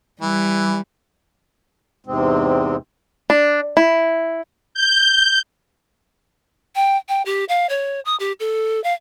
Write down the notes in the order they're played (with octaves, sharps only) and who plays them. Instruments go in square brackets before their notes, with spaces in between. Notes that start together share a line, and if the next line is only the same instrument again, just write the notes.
[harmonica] E3 [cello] G3
[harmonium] E2 G#2 C3 G#3 C4
[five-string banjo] D4
E4
[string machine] G6
[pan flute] G5
G5
G4
F5
C#5
D#6
G4
A4
F5